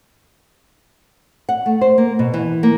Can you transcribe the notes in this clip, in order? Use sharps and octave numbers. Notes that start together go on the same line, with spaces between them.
F#5
A3
C5
A#3
B2
E3
A#3